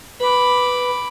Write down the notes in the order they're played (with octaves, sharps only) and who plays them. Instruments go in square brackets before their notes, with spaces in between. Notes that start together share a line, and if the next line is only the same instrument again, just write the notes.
[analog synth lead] B4 [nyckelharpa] B5 D6